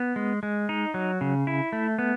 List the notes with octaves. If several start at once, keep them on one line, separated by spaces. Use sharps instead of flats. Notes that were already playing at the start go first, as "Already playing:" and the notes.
Already playing: B3
G#3
G#3
D#4
F#3
C#3
E4
A3
B3